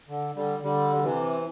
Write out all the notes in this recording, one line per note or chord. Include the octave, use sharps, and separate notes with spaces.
D3
D3 G3
D3 G3
G3
C3 E3